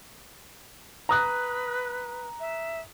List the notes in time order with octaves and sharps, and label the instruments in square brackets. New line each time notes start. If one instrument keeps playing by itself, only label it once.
[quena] B4 [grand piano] A#5 D#6 F#6
[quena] E5